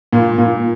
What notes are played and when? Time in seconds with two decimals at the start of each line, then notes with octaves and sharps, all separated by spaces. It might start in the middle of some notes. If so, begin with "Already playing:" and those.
0.13 A#2
0.38 A#2